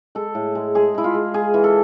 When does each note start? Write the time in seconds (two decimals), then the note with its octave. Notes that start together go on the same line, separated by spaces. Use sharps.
0.15 G#3 A4
0.35 A2
0.55 G#3
0.75 G#3 G#4
0.95 G#3 E4
1.04 F4
1.14 G#3
1.34 G#3 G#4
1.54 E3
1.64 A4